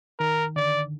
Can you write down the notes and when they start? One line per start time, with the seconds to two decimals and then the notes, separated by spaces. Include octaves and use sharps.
0.19 D#3 A#4
0.56 D3 D5